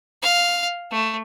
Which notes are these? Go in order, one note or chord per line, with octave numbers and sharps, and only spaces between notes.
F5
A3